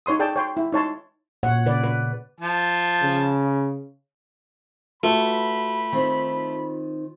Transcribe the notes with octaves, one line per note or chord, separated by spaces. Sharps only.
D#4 C#5 C6 D#6
G#4 D5 G5 A5
C#5 G5 C6
E4
D#4 C#5 A5 C6
A#2 C#5 F#5
C#3 B4 D5
B4
F3 A5
C#3
A3 F4 F#4 B4 B5
D#3 C4